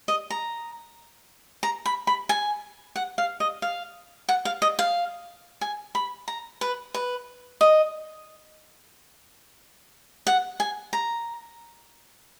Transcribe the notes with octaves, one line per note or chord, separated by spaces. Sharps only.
D#5
A#5
A#5
B5
B5
G#5
F#5
F5
D#5
F5
F#5
F5
D#5
F5
G#5
B5
A#5
B4
B4
D#5
F#5
G#5
A#5